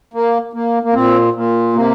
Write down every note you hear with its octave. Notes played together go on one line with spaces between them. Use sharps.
A#3
A#3
A#3
A#2 C4
A#2
C3 A#3